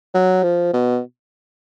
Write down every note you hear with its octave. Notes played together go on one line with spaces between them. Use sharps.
F#3
F3
B2